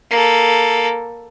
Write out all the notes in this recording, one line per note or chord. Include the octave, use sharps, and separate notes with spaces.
A#3 A4